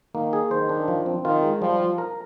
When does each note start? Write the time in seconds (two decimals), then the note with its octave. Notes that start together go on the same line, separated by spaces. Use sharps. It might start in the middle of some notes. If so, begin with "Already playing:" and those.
0.14 D#3 A#3
0.33 G#4
0.51 D#3 C5
0.69 D4
0.88 F3
1.06 C4
1.24 D#3 F4
1.43 G#3
1.61 F3 G3
1.80 F4
1.98 A#4